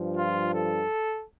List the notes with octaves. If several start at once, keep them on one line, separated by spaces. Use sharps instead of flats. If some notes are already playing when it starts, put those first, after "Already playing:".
Already playing: G2 F3
F4
A4